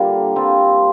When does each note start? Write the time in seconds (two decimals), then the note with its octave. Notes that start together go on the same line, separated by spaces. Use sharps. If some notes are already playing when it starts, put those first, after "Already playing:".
Already playing: A#2 D3 G3 A#3
0.36 G3 C4 F4